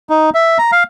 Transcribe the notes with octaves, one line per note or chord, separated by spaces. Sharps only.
D#4
E5
A#5
F5